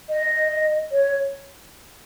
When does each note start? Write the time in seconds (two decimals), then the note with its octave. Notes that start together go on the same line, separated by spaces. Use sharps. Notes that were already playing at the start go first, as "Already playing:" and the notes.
0.10 D#5
0.92 C#5